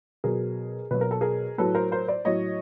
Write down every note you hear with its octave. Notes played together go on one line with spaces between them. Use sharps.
B2 F#3 G#4 A#4
B2 F#3 B4
A#4
A4
G#4 A#4
A2 F#3 A4 B4
A#4 C5
A#4 C5
C5 D5
A2 F#3 C#5 D#5